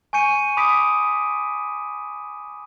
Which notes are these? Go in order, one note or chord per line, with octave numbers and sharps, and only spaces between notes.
G#5 C#6 G6 C#7 D#7
B5 D6 D#6 B6 D7